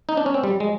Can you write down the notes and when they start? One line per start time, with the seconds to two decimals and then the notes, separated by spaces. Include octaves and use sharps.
0.09 D#4
0.17 D4
0.26 C#4
0.34 C4
0.44 G3
0.60 G#3